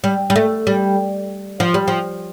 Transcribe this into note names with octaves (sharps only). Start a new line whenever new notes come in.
G3
G3
A3
G3
F3
G3
F3